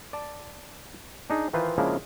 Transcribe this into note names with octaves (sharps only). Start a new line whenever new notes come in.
D5 A5
D4 D#4 G#4
D#3 E3 D#4 F4 B4 C5
C#3 F3 G#3 A#3 D4 E4